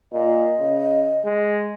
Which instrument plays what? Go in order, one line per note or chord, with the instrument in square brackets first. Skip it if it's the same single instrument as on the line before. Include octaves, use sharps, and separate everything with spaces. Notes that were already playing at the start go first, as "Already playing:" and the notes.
[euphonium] A#2 [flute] D#5
[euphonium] C#3
G#3